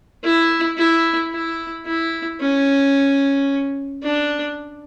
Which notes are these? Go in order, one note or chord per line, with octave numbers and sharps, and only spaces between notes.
E4
E4
E4
E4
C#4
D4